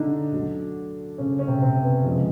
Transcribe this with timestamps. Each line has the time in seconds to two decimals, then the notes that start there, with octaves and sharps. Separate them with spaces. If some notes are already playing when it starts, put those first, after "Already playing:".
Already playing: D3 D4 D#4
0.32 D2 D3 F#3
1.18 C#3 C#4
1.39 C#4
1.48 C3 C4
1.62 C3 C4
1.83 B3
2.05 F2 C#3 F3 G#3